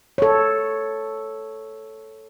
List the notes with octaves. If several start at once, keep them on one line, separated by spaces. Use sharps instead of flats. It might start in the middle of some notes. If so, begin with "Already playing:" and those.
A4 C#5